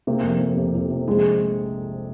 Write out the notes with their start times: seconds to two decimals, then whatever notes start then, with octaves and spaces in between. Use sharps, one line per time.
0.07 C3 A#3
0.23 F1
0.41 F1
0.57 C3
0.74 F2
0.90 C3
1.07 A#1 G#3